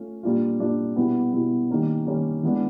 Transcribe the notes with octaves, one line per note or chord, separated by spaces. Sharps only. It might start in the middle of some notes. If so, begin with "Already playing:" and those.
Already playing: A3 C#4 F4
A#2 G3 A#3 D4 F4
A#2 G3 A#3 D4 F4
B2 G3 B3 E4
B2 G3 B3 E4
D#3 G3 A#3 C#4
D#3 G3 A#3 C#4
E3 G#3 B3 D4